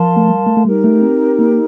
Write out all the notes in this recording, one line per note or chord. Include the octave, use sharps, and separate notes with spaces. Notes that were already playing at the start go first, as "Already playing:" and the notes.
Already playing: F3 A#4 F5 A5 C6
A3
G3
A3
A3
G3 D#4 G4 A#4
A3
C4
A#3